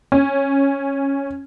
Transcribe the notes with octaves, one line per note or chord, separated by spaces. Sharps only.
C#4